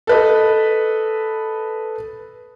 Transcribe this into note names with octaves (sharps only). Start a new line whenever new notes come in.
A4 B4 D#5